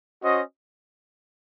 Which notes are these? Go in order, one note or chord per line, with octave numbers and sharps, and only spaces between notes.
C#4 F#4 C5 D#5